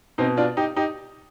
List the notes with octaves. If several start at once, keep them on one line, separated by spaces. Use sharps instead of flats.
B2 C4 D#4
D4 F4
D#4 G4
D#4 G4